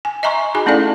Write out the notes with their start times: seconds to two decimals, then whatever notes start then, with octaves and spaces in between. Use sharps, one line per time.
0.05 G#5
0.23 D#5 E5 G#5 A#5 C6 C#6
0.54 D#4 F#4 G#4 G#5 B5
0.66 A3 C#4 E4 A4 D5 F5